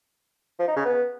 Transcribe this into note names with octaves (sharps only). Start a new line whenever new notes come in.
F3
D#4
C#3
B3